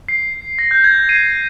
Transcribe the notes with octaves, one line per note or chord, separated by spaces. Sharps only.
C7
A#6
G6
G#6
C7 D#7